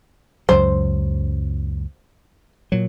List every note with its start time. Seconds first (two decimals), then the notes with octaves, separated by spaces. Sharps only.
0.49 C#2 F#2 F#3 C5
2.72 A#2 F#3